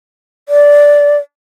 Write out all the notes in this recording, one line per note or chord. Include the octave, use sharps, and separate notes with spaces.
D5